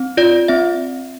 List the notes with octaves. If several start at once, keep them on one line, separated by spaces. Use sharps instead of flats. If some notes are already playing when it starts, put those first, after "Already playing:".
Already playing: C4
F4 D5
C4 E5